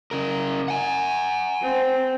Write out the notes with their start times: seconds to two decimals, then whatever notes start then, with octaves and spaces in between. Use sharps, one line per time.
0.11 C#3 A#4
0.68 F#5 G#5
1.62 C4